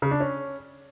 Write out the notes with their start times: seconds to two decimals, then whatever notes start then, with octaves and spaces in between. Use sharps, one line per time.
0.02 C#3
0.11 D4
0.20 C#4